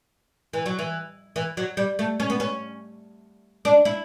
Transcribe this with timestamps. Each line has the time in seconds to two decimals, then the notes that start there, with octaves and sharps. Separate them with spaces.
0.53 E3
0.66 F#3
0.79 E3
1.36 E3
1.57 F#3
1.77 G3
1.99 A3
2.20 C#4
2.30 B3
2.40 C#4
3.65 D4
3.85 E4